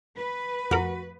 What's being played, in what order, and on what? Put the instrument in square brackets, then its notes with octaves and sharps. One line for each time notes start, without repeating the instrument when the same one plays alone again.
[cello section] B4
[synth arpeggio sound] F2 A#4 [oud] F#4